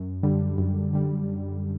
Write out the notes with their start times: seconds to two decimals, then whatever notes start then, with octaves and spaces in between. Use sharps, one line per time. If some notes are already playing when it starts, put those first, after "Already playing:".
Already playing: F#2
0.23 D3 G3
0.58 F#2
0.93 D3 G3